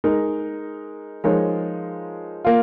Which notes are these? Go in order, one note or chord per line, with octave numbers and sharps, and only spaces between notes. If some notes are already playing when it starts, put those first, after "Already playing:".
G#3 D#4 A#4
F3 G#3 D#4 A#4 C#5
A#3 F4